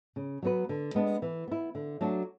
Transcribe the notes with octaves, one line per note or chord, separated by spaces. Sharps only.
C#3
F#3 B3 F#4 B4
D3
G#3 B3 D4
E3
B3 E4
D3
F#3 A3 D4 F#4